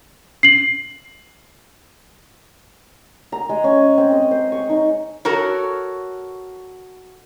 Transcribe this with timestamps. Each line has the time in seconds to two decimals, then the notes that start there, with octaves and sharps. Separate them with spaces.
0.43 C7 F#7
3.32 A#5
3.49 G#3
3.64 C#4
3.98 C4
4.12 D#5
4.31 C5
4.52 C#6
4.69 D#4
5.25 F#4 A4 A#4 C#5